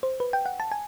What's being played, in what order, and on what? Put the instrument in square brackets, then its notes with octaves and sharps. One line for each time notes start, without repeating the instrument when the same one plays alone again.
[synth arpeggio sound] C5
B4
G5
F#5
A5
G#5